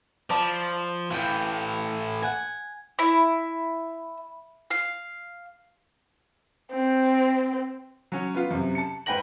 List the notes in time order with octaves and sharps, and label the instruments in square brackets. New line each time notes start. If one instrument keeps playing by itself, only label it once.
[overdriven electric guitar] F3 [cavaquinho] D5 A5 B5
[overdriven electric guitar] A2 E3 [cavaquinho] F5 G5
[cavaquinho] F#5 G#5
[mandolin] E4
F5
[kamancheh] C4
[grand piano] F#3 C#4
B3 F4
F#2 C3
A5 C#7
G#2 B4 G5 G#5 A#6 F#7